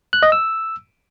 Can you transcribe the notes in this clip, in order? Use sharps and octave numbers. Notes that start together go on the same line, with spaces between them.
F#6
D#5
E6